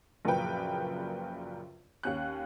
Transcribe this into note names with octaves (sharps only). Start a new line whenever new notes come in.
A#1 F#2 C#3 A#4 B4 G5
D#2 C#4 F#6